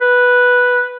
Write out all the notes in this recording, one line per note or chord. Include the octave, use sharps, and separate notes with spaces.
B4